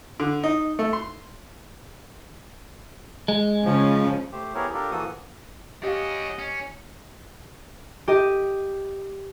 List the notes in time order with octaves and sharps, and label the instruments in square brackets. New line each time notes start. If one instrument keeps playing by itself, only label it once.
[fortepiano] D3
D#4
A3
C6
[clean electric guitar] G#3
[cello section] C#3 C#4 [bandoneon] F3
[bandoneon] A3 G4 C5
B3 E4 G4 G#4 A#4 C#5
D4 F4 G4 A4 A#4
E3 F3 A#3 F#4 A4 D#6
[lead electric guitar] C#4 F#4 [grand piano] G4 F5 [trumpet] D#5
[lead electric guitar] C#4
[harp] G4 D#5